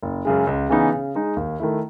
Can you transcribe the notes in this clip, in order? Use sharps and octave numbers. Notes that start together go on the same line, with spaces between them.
F#1
F#2 C#3 G#3
C#2
C#3 E3 B3 D#4
C#3
G#3 D#4
D#2
D#3 A3 E4